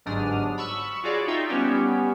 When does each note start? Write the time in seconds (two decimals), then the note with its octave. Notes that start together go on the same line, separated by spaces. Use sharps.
0.06 G1 G#2 F#3 D4 D#6 F6
0.58 B5 C#6 E6
1.03 F4 F#4 G#4 C#5 D5
1.27 D#4 F4 E5 G5
1.48 G3 B3 C#4 G4